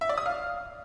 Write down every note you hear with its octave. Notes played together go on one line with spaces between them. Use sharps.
E5
D5
D#6
F5